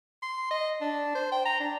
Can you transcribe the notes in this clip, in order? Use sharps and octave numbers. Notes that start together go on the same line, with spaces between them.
C6
D#5
D4
C5
G5
A#5
D4